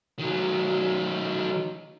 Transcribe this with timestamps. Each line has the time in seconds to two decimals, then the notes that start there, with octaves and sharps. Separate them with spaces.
0.19 D#3 F#3